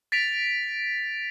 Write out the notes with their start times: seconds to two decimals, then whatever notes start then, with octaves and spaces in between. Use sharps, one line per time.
0.12 A6 B6 D7 F7